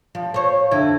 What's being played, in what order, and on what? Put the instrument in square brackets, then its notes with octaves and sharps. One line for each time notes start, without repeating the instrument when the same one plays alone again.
[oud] F3
C5 C#5
F2 D3 E4